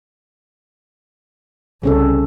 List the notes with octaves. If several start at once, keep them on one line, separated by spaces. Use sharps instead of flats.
C2 C#3 C#4 A4